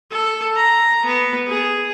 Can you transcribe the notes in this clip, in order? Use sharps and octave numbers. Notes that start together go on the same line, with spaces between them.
A4
A#5
B3
G#4